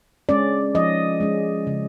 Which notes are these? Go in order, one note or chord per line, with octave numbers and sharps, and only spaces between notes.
G#3 C#4 D5
F3 D#5
G#3 C#4
C#3